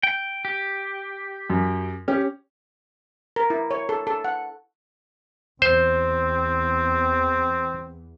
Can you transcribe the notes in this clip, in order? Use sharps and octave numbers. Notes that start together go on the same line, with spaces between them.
G5
G4
F#2
C#4 G4
A#4
E4
C#5
A4
A4
F#5
E2 C4 C5